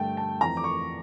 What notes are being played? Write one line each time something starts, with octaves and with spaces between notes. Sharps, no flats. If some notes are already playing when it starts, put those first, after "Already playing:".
Already playing: G2 D3 A3 G5 A5
A5
F2 E3 A3 A#5
D6
C#6